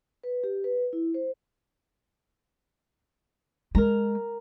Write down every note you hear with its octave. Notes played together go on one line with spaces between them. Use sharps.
B4
G4
B4
E4
C5
G#3 A#4 A#5